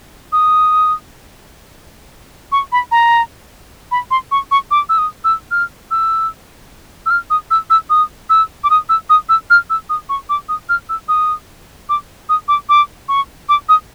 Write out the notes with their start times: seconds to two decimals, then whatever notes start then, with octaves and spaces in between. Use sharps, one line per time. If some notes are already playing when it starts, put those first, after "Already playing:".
0.33 D#6
2.52 C#6
2.72 B5
2.92 A#5
3.91 B5
4.11 C6
4.31 C#6
4.51 C#6
4.71 D6
4.89 E6
4.98 D#6
5.24 E6
5.51 F6
5.91 E6
7.06 E6
7.11 F6
7.30 D#6
7.51 E6
7.70 E6
7.90 D#6
8.30 E6
8.64 D6
8.70 D#6
8.89 E6
9.10 D#6
9.29 E6
9.50 F6
9.70 E6
9.90 D#6
10.09 C#6
10.29 D6
10.49 D#6
10.69 F6
10.89 E6
11.09 D#6
11.89 D6
12.29 D#6
12.48 D6
12.69 D6
13.09 C#6
13.49 D6
13.69 D#6